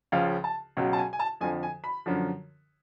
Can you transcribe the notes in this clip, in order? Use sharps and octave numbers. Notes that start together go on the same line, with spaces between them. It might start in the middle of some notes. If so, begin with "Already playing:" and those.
C#2 C#3 F3 F5
A5
C#2 B2 F#3
A5
G#5
G#5
A5
F2 D3 F3 G#5
G#5
B5
F#2 D3 F3